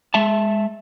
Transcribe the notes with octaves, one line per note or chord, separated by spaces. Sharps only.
G#3 E5 A5